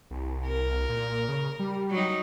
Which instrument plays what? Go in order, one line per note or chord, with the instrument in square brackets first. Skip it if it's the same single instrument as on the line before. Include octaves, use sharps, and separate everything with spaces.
[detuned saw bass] C2
[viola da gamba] A#4
[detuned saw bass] A#2
C#3
G3
[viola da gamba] F#3 D#4